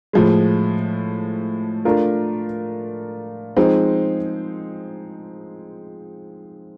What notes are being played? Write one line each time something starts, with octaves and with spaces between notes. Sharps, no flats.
A2 F3 G#3
A3 D4 F4 A#4
F3 G#3 C4 D#4